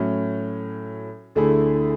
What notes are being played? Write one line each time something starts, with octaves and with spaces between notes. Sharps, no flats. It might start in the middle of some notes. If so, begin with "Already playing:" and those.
Already playing: A2 F#3 C#4
D2 D3 A3 E4 G#4